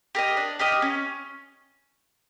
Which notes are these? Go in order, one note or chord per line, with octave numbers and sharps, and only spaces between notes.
G4 A#4 D#5
D4
G4 A#4 D#5
C#4